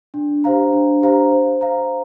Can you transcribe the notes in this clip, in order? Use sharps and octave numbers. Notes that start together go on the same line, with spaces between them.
D4
G4 C5 F5 A#5
D4
G4 C5 F5 A#5
C5
F5 A#5